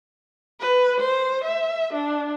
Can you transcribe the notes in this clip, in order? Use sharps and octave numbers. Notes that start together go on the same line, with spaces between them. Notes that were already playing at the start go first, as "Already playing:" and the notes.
B4
C5
E5
D4